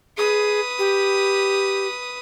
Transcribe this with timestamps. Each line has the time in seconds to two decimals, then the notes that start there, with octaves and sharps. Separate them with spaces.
0.18 G#4 B4 D#6
0.79 G4